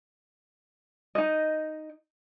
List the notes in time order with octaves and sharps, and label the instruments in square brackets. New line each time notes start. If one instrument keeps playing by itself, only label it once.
[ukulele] D#4 D#5